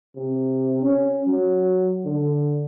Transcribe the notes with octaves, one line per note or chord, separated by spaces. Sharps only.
C3
C#4
F#3
D3